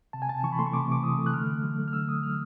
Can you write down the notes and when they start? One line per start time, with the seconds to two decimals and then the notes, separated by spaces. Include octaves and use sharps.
0.13 C3 A5
0.22 G#5
0.29 C3 A5
0.43 E3 C#6
0.52 B5
0.59 A3 C6
0.66 C#6
0.73 C3 D6
0.88 C3 D6
1.03 E3 D#6
1.18 A3
1.26 F#6
1.33 D3 F6
1.48 D3
1.63 F#3
1.78 A3
1.88 F6
1.93 D3 E6
2.09 D3 D#6
2.23 F#3 F6